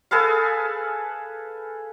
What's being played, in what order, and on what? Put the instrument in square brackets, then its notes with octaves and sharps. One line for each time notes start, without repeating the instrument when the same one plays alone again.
[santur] G#4 A4 B4 F5